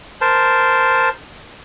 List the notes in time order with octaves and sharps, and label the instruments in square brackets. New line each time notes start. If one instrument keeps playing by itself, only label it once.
[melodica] A#4 C5 A5